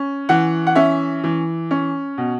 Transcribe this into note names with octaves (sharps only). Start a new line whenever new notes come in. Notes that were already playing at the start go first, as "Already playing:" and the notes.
Already playing: C#4
E3 F#5
F#5
C#4 E5
E3
C#4
B2